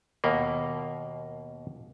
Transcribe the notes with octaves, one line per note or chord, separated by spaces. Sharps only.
D#2 B2 A#3